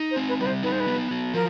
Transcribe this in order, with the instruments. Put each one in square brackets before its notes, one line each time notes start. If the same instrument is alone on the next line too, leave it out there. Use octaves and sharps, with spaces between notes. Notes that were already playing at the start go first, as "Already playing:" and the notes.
Already playing: [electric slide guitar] D#4
[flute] C5
[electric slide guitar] C4
[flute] B4
[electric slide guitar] G3 [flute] B4
[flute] C5
[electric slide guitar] D#4 [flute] B4
[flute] C5
B4
[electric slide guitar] B3
F#3
[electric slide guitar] F3 [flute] A#4